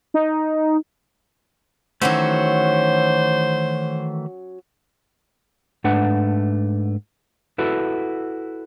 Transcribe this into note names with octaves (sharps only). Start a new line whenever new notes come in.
D#4
D#3 E3 F#3 A3 C#4 F#4 C5
G#2 A3 D4 B4 F#5
E4 F#4 A4 B4